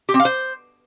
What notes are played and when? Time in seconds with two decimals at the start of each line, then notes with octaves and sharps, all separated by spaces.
0.09 G4
0.14 C4
0.20 F5
0.25 C5